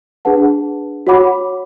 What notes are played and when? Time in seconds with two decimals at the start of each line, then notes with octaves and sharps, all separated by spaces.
0.25 D4 G#4 B4 F#5 A5
1.07 F#4 C#5 F#5 B5 D6